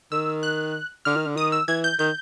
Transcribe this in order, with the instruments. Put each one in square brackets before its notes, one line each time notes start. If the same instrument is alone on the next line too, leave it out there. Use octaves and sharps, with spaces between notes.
[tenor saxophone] D#3 [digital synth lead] E6
[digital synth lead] F#6
[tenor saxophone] D3 [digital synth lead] F6
[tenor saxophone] D#3
D3
[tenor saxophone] D#3 [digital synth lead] D#6
[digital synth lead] E6
[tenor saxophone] E3 [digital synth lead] G#6
[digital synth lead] G6
[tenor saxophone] D#3 [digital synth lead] G6